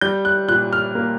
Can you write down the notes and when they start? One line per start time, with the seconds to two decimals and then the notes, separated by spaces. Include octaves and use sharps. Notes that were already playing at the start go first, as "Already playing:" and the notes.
0.01 G3 G6
0.25 F#6
0.48 A#2 F#6
0.73 F6
0.95 A#3